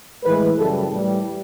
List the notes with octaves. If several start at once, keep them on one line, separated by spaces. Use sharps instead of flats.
A2 E3 G#3 B4
F#2 C#3 E3 G3 A4
A2 E3 G3